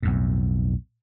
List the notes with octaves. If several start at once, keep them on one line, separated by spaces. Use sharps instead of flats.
B1 F2 A2